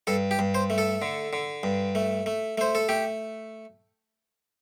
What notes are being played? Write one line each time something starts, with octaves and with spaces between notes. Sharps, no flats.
G2 A4
G4
G2
C5
A3
A4
D3
D3
G2
A3
A3
A3 C5
A4
A3 G4